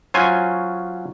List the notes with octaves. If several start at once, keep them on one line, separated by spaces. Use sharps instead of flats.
F#3 C#4 F4 C5 G#5